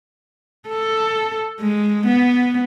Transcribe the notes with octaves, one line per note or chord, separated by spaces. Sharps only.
A4
G#3
B3